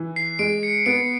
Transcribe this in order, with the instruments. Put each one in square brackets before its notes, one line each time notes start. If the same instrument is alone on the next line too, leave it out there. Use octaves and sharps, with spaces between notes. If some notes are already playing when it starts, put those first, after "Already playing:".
Already playing: [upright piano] E3
[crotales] C7
[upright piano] G#3 [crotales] D7
[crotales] C#7
[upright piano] B3 [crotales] D7